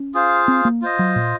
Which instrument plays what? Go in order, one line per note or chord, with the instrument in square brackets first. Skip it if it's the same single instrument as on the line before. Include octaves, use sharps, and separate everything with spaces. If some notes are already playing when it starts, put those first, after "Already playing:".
Already playing: [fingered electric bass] C#4
[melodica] F4 G#4 C5 F5
[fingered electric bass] C4
A#3
[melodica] F4 C5 D#5
[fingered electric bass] F#3
A#2